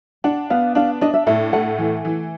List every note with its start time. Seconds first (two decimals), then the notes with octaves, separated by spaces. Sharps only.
0.24 D4 F#5
0.50 B3 F5
0.75 D4 F5
1.01 D4 D#5
1.14 E5
1.27 A2 E5
1.53 A3 F#5
1.78 E3
2.05 E3